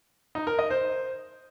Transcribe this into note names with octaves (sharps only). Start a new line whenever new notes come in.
D#4
A#4
D#5
C5